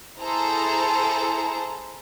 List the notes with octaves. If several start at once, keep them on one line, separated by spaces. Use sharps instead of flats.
E4 G#4 A4 C5 A#5